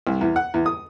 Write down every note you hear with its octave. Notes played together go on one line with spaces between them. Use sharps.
C2
E2
F#5
E2
D#6